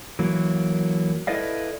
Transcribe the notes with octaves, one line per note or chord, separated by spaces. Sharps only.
E3 F#3 A#3
E4 A4 B4 D5 D#5 F5